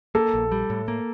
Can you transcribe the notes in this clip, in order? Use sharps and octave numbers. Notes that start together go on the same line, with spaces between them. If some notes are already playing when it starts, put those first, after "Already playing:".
A#3 A4
A#1
G3
A2
A#3